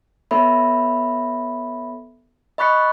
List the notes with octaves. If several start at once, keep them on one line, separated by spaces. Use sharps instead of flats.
B3 A4 C#5 E5 B5
D#5 B5 C#6 F#6 B6 C#7